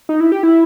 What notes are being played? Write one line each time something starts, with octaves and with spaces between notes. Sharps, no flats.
D#4
E4
G4
E4